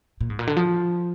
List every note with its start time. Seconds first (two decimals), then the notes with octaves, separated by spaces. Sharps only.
0.21 A#2
0.30 G#2
0.39 A#2
0.47 D3
0.57 F3